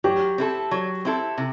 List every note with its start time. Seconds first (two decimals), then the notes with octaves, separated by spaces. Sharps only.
0.04 F#3 G4
0.38 C4 E4 A4
0.71 F#3
1.05 C4 E4 A4
1.38 C3